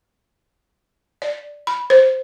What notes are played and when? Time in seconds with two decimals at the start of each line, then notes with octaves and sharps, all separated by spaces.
1.22 D5
1.67 B5
1.90 C5